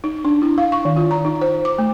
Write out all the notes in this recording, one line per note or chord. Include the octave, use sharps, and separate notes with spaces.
D#4
D4
E4
F5
C#6
D#3
F4
A#5
D#4
C5
D6
A3